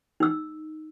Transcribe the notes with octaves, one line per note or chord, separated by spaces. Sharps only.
D#4 E6